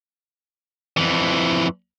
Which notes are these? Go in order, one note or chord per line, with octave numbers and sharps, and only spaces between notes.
F2 E3